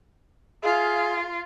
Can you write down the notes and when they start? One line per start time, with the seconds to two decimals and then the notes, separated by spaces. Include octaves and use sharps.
0.63 F4 G#4 E5 F5